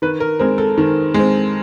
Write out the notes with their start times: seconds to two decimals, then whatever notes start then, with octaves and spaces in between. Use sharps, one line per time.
0.02 D#3 B4
0.20 A#4
0.39 G#3 C4 A#4
0.58 A4
0.78 D#3
1.14 G#3 C4